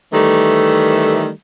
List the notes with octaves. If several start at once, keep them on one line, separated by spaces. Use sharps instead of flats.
D#3 E3 G3 A3